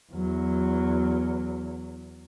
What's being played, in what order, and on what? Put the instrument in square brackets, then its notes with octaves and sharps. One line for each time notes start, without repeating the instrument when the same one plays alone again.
[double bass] E2 F#3